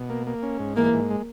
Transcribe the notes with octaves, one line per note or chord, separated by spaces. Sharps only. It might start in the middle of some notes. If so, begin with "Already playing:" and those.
Already playing: B2
A#3
A#3
C#4
G#2
E3 A#3
G#2
G#3